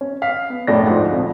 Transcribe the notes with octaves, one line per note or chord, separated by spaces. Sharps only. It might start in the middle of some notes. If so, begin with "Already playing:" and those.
C#4
F5 B6
B3
B1 F#2 A2 D4 D5 A#6
D2 G#2 F3 C5
A#1 F2